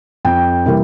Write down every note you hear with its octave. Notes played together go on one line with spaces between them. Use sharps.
F2 G5
C3 E3 G3 A#3